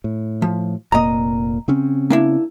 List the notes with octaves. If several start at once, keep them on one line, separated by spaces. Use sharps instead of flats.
A2
F3
F1 A#2 A#3 D#5 A#5
C#3 C4 C#4
A#3 D4 E4